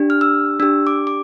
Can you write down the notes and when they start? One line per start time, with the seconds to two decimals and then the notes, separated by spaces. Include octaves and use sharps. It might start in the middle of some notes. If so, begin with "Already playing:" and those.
Already playing: D4 G4
0.10 F6
0.21 E6
0.60 D4 G4 E6
0.87 D6
1.07 D6